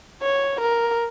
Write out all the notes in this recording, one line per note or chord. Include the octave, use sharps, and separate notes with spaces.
C#5
A#4